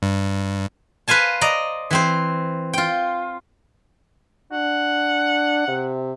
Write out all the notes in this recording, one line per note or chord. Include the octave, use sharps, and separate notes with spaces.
G2
B4 C5 F5 G#5 A5
D5 D#5 A#5
E3 C4 C5
F4 G5
D4 F#5
C3